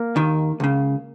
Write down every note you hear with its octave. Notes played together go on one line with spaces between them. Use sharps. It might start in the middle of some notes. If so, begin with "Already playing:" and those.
Already playing: A#3
D#2 D#3
C#2 C#3